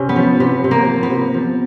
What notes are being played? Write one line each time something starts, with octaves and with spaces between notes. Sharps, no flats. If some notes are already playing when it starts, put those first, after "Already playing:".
Already playing: C3 C#4
B3
F3
C3 B3
C3
A#3
F3
B3
C3
F3